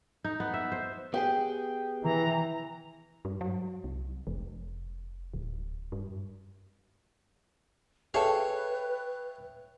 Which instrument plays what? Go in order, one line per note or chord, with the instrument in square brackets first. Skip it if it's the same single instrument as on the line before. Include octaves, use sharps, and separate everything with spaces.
[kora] D#4
B3
E5
C5
[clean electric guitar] B3 G4 G#4 [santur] G5
[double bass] E3 [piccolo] A#5
[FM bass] G2
F#3
C2
F1
D1
G2
[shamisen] G#4 A4 [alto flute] B4 [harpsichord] C#5 F5 [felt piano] E5 G5